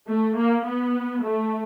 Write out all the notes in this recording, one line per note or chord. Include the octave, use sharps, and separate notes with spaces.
A3
A#3
B3
A3